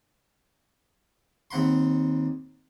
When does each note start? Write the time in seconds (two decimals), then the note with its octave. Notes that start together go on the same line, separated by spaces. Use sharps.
1.51 D#2 C4 F#5 B5 C6